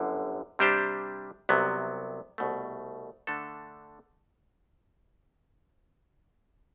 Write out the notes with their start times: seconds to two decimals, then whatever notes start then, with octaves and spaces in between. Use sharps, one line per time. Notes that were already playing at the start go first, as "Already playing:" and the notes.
Already playing: G1 F#2 D3
0.59 C3 G3 D4 G4 C5
1.49 C2 C3 F#3 B3
2.38 C2 B2 A3
3.27 D3 A3 D4 A4